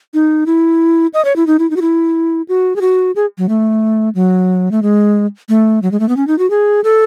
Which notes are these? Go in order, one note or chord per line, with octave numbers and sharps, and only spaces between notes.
D#4
E4
D#5
C#5
E4
D#4
E4
D#4
F#4
E4
F#4
G#4
F#4
G#4
F#3
A3
F#3
A3
G#3
A3
F#3
G#3
A3
B3
C#4
D#4
F#4
G#4
A4